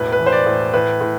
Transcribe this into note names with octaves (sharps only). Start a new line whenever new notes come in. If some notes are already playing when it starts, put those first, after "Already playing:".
Already playing: E1 A2 B4
B4
E3
C5
D5
A2
A2 B4
A2